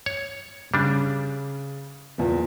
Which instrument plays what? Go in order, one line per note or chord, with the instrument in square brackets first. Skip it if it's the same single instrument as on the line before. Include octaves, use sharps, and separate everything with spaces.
[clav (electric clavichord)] C#5
[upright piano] C#3 [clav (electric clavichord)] G3 D4
[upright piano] E2 A#2 F3